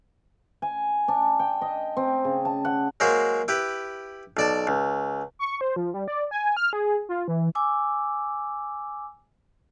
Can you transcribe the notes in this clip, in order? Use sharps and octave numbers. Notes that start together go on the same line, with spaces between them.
G#5
D4
G5
D#5
C4
C#3
A5
F#5
F#3 G#3 A#3 F#4 C5
E4 G4 B4
B1 D5 A5
C#2
C#6
C5
F3
G3
D5
G#5
F6
G#4
F4
E3
G#5 D6 E6